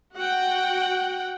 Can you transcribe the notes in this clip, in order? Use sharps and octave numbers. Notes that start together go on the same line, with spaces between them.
F#4 F#5 G5